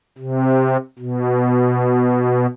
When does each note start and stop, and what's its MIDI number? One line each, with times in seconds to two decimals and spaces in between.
0.18 0.77 48
0.99 2.46 47